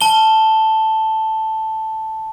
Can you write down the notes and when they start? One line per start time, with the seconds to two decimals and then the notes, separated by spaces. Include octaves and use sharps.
0.01 A5 G7